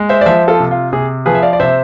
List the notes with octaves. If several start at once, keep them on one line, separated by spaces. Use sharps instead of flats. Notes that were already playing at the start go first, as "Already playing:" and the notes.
Already playing: G#3
C5 E5
D5
F3 C5 E5
F4 A4
C3
F4
C3 G#4
F3 G#4 B4
E5
D5 F5
D5
C3 C5 E5